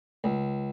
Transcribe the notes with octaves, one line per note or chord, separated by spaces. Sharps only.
C#2